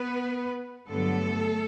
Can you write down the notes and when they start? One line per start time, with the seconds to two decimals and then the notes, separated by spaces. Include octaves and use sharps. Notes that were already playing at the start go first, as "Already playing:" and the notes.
Already playing: B3 B4
0.87 G2 D3 F#3 A3 B3 A4